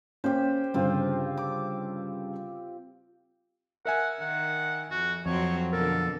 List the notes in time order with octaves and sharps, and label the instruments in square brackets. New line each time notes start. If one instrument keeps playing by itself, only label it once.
[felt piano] A#3 C#4 [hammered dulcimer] G4 C5
[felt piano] G1 G2 C#3 [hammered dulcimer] C4 F4
[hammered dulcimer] D6
[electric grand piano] A#4 E5 G#5 [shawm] F#5
[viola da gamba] D#3 [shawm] F#5
[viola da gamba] F2 [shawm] F#4
[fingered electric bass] F2 [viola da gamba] F#3 C4 C5 [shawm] C#5
[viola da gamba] B2 D3 [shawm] A4 [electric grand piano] A#4